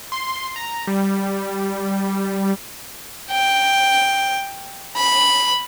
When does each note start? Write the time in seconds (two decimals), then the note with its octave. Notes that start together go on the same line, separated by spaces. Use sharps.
0.12 C6
0.56 A#5
0.87 G3
3.31 G5
4.96 B5